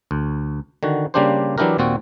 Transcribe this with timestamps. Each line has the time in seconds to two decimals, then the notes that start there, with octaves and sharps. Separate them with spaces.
0.11 D2
0.83 D3 D#3 F#4
1.14 C#3 G3 A#3 D4 G4 C5
1.58 E3 F#3 D4 E4 G4 A#4
1.78 D#2 A#2 C4 F#4